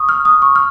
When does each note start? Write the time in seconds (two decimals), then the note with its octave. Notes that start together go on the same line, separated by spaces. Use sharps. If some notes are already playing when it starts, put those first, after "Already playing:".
Already playing: C#6 D#6
0.09 F6
0.25 D#6
0.42 C#6
0.56 F6